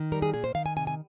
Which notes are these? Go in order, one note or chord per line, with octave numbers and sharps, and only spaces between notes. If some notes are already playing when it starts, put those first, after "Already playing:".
Already playing: D#3
G3 A#4
G#4
A#2 G#4
C5
D#3 F5
G#5
C3 G#5
G#5